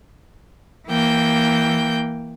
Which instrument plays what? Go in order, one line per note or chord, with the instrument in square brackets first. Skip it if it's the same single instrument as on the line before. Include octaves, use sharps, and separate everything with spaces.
[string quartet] E3 A#3 G5 G6